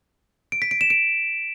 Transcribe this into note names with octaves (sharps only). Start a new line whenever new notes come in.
D7
B6
D7
E7
D7